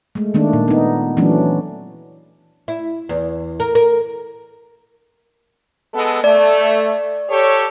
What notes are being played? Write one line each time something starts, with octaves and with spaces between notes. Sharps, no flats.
G#3 A3
D#3 A3 A#3 D4
A#2
B3 D#4
E3 F#3 A3 C#4 D4
E4
E2
A#4
A#4
G#3 B3 A4
A3 D5
G4 A4 C#5